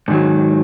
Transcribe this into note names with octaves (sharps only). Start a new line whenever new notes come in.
G#2 D#3 F#3